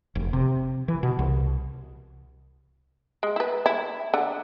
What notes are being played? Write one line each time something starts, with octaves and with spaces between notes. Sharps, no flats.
F1
C3
E3
B2
C2
G#3
E4 B4
E4
D3